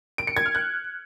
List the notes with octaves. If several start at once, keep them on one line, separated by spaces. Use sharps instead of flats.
D7
C#7
G#6
F6
F#6